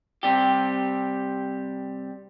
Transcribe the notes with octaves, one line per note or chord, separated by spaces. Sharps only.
C3 G3 G4